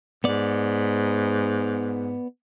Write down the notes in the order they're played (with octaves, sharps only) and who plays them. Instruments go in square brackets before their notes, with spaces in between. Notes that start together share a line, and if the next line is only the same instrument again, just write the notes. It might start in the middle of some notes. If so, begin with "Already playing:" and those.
[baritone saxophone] G#2 [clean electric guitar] B3 D5